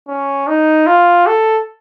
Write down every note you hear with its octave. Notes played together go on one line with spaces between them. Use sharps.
C#4
D#4
F4
A4